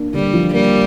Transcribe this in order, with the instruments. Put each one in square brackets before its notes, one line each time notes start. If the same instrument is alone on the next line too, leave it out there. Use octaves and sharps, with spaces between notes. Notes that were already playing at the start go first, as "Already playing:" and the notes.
Already playing: [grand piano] A#3 D4
[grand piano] D3 [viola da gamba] G3
[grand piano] F3
[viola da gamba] G3 [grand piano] A#3